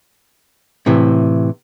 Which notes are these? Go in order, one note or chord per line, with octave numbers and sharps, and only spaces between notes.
A2 C3 E3